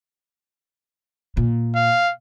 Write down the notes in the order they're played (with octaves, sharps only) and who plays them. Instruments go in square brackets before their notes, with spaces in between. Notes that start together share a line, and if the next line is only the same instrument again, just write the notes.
[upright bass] A#2
[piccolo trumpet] F5